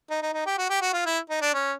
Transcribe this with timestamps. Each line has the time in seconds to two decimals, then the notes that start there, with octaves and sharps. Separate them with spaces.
0.10 D#4
0.22 D#4
0.33 D#4
0.46 G4
0.58 F#4
0.70 G4
0.81 F#4
0.93 F4
1.06 E4
1.30 D#4
1.41 D4
1.54 C#4